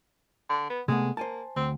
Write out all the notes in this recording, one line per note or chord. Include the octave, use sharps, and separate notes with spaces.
D3
B3
C3 G#3 A3 B3
A#3 C5 G#5 A5
D2 C4